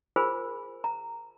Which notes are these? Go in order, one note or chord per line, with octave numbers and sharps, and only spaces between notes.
F4 G#4 A#4 C5 G#5 B5
A#5